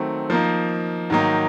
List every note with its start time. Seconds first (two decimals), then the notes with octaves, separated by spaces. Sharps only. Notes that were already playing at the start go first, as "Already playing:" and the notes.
Already playing: D#3 F#3 A3 C4
0.30 F3 A#3 D#4
1.10 G#2 D#3 F#3 A#3 D#4